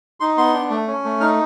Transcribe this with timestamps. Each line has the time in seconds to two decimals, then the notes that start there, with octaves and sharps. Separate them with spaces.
0.20 D#4 C6
0.37 B3 C6
0.53 D4
0.70 A3
0.87 C#4
1.04 A3
1.20 D#4 F6